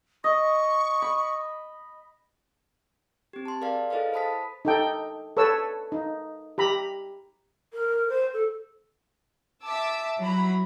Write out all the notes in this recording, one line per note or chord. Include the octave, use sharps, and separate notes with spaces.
D#5 C#6
B5
C4 G4
A5 C6
G#4 A#4 D5 F5
E4 G#4 A4 B4 D#5 F5
C5 A5 B5 D#6 B6
D#4 A4 G5
A4 B4 C#5 E6
D#4
G4 A#5 B5
A#4
C5
A4
E5 A5 D6 E6
F#3 E4 F#4 A#5 B5